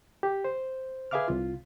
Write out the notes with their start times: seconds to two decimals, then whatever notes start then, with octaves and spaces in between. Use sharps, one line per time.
0.23 G4
0.45 C5
1.11 G#4 B4 E5 F5 D6 F6
1.28 C2 F4